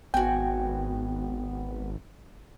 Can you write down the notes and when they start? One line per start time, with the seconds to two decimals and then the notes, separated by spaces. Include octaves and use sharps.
0.14 G#1 B3 F#4 G5 G#5